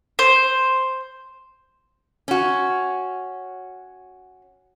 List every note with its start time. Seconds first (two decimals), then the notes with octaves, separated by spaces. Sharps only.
0.19 C5
2.28 C#4 F#4